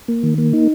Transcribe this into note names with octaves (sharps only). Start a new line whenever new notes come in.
A#3
D#3
A#3
D#4